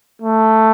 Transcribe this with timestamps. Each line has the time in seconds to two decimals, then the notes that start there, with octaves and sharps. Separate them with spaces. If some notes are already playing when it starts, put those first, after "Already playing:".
0.22 A3